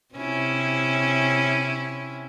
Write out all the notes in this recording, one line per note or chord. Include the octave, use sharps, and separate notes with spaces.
C3 C#4 E4